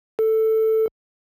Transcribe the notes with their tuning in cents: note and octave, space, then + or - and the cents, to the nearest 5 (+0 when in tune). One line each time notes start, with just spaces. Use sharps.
A4 +5